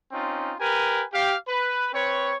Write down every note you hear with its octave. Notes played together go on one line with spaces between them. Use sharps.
C4 C#4 D#4 F4
G4 A#4 B4 G#5
G4 F5
B4
C4 B4 C#5